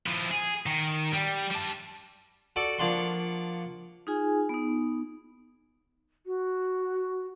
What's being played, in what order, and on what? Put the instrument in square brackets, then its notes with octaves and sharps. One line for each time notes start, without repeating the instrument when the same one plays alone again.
[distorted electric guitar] F3 E4
G#4
D#3
G3
G3 A5
[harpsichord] F#4 A4 D5
F3 A#3 D4 F#5 C6 C#6
[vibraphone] D#4 F4 G#4 G#5
B3 D#4
[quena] F#4